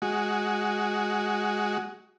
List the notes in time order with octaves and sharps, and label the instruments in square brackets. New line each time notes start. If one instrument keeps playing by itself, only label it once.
[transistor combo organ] G#3 F#4